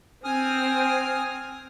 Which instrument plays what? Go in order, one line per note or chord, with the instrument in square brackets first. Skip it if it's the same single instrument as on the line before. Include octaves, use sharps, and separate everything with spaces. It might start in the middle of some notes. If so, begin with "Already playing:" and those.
[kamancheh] C4 [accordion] G#5 D#6 F6